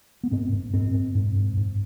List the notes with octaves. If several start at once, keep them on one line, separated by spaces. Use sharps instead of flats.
B3
G#2 C4
G#2
G#2 C4
G#2
G#2
G#2
G#2